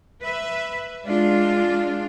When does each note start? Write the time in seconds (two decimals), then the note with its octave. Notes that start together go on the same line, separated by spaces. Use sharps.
0.22 B4 E5
1.04 G#3 D4 F4